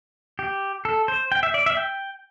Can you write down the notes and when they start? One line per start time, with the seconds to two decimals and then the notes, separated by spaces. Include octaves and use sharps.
0.39 G4
0.85 A4
1.08 C5
1.32 G5
1.43 E5
1.54 D5
1.66 E5
1.77 G5